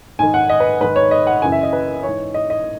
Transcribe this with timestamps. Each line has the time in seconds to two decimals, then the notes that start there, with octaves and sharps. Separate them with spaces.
0.19 G#2 D#3 G#5
0.34 F#5
0.49 D#5
0.60 B4
0.81 G#2 D#3 B4
0.96 C#5
1.11 D#5
1.27 F#5
1.42 F#2 C#3 E3 G#5
1.52 E5
1.63 D#5
1.73 B4
2.03 G#2 E3 C#5
2.34 D#5
2.50 D#5